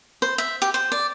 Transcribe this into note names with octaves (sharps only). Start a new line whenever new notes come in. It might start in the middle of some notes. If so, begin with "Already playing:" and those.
C5
E5
G4
C5
D5